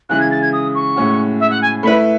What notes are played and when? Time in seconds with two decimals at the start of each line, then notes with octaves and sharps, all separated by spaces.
0.09 C#3 E3 G#3 F#6
0.20 G#6
0.31 A6
0.42 G#6
0.53 D#6
0.75 C#6
0.96 A2 G#3 C#4 F#4
1.40 E5
1.50 F#5
1.62 G#5
1.83 A3 E4 B4 B5